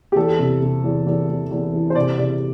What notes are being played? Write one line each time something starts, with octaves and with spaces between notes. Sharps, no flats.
G4
E2 A4
C3
C3
E2
E2
E2
E2
E3
C5
C3 D5
C3 D5